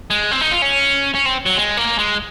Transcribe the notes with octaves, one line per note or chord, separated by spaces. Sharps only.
G#3
C4
D#4
F4
C#4
C#4
C4
F#3
G#3
A#3
G#3